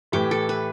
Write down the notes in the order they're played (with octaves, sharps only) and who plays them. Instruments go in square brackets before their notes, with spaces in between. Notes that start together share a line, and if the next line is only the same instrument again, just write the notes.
[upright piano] A2 E3 A3 [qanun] G4
[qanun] A4
B4